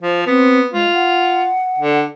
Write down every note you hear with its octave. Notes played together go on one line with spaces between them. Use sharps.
F3 C5
B3 C4
G#3 F4
F#5
D3